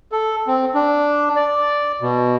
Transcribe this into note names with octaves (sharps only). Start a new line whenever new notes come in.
A4
C4
D4
D5
B2